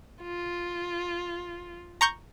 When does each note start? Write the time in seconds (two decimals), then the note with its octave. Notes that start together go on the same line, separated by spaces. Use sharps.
0.23 F4
2.01 A#5 C#6 G6